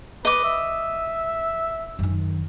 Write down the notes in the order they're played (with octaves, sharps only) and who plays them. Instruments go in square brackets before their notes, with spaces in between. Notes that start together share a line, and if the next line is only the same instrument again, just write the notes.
[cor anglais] B4 [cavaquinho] D#5 D6
[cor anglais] E5
[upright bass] F#2 D#3